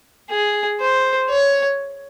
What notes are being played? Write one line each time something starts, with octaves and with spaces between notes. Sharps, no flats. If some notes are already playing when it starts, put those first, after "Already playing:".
G#4
C5
C#5